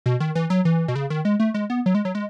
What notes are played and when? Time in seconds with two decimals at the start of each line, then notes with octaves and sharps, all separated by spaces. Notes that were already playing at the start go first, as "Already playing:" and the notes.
0.06 B2
0.20 D#3
0.35 E3
0.50 F#3
0.65 E3
0.88 B2
0.95 C#3
1.10 D#3
1.25 G#3
1.40 A3
1.54 G#3
1.70 B3
1.86 F#3
1.95 G#3
2.05 F#3
2.15 G#3